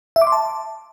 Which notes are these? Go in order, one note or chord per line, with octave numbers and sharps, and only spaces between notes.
E5
D6
C6
A5